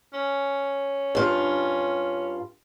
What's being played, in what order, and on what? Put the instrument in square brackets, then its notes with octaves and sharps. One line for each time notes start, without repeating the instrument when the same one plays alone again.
[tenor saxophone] C#4
[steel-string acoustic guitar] G2 F4